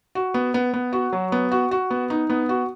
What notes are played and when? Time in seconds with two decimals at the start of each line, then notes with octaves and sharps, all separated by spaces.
0.15 F#4
0.34 B3
0.54 B3
0.74 B3
0.93 F#4
1.13 F#3
1.32 B3
1.52 F#4
1.71 F#4
1.90 B3
2.10 D#4
2.30 B3
2.49 F#4